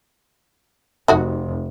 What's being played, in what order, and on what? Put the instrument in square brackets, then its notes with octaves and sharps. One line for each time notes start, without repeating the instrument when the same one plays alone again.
[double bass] F1 [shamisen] D#4 F#4 F#5